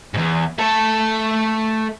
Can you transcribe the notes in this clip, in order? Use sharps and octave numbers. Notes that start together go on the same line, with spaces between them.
E2 G#2
A3 A4